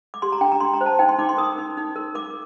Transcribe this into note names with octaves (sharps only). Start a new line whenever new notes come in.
D6
G4 C6
A#5
D4 G5
A#5
D4 C6
A#5
C5
A5
D#4 G5
C6
D#4 D6
C6
A#4 D#6
D#4
D#4
A#4
A#4 D6